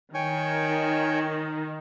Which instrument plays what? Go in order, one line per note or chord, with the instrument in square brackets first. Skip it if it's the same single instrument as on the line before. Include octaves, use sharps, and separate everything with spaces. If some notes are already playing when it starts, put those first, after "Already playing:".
[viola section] D#3 [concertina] C#5 G5 G#5